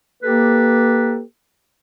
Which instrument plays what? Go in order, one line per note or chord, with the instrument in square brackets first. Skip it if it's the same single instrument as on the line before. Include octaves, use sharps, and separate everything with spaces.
[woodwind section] A#3 G4 A4 B4